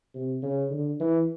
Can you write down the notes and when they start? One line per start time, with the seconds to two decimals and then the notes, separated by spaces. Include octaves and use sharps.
0.15 C3
0.43 C#3
0.71 D3
1.00 E3